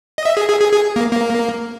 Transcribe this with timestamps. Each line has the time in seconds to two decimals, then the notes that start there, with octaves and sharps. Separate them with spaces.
0.18 D#5
0.25 E5
0.37 G#4
0.49 G#4
0.60 G#4
0.72 G#4
0.96 A#3
1.11 A#3